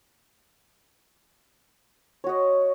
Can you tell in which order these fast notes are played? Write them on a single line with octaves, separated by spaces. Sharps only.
C#5 F#4 D#5